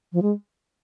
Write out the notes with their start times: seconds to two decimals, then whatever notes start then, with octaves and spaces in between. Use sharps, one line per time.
0.13 F3
0.22 G#3